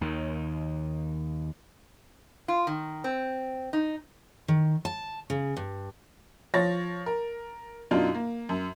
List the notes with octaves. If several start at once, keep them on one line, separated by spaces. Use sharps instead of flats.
D#2 D#3
F4
D#3
C4
D#4
D#3
A5
C#3
G2
F3 C#5 A6 A#6
A#4
F#2 B2 D4 D#4 F4
A#3
F#2